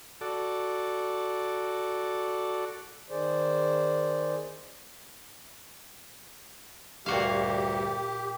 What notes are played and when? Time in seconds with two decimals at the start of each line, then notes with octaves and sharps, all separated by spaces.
0.21 F#4 A4 D5
3.10 D#3 G#4 C5 D5
7.06 D2 G2 A#2 F#4 G4 F5